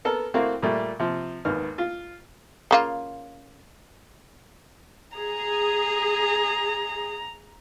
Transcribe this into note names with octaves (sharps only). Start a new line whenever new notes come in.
B3 A4 A#4
A3 A#3 C4 E4 F#4 F5
A#2 G3 A3
C3 F3
G#1 D#2 B3 F6
F4
C#3 A#3 F4
G#4 A#5